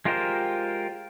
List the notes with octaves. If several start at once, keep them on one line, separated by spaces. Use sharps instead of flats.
G#3 F4 G4 A#4 C5